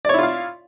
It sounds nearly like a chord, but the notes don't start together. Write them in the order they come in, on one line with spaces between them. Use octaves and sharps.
D5 C#5 E4 F4 F5